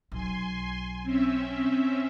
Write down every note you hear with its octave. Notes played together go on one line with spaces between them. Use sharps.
B1 G#5 C6
C4 C#4 E5